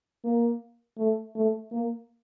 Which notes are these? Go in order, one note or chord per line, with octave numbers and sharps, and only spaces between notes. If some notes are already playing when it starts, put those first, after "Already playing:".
A#3
A3
A3
A#3